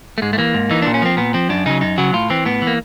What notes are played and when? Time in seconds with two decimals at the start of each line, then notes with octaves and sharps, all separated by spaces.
0.18 A3
0.22 G#2 G#3
0.33 A3
0.38 E3 A#3
0.54 G#2
0.71 E3 D#4
0.82 A#2 D4
0.94 C#4
1.02 F3 C4
1.17 A#2 B3
1.34 F3 C4
1.49 F#2 D4
1.66 C#3 F#3 D#4
1.81 F#2 D#4
1.98 C#3 F#3 F#4
2.13 A2 F4
2.30 E3 C4
2.45 A2 B3
2.62 E3
2.67 A#3